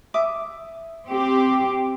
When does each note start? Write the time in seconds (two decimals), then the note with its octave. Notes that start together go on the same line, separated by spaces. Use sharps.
0.14 E5 D6 D#6
1.07 C4 G4